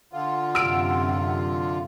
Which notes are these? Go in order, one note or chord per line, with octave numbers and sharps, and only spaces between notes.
D3 F4 F#5
F#2 C3 E6 F6 D7